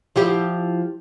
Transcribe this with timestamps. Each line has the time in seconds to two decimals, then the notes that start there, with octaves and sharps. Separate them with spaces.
0.16 F3 E4 G4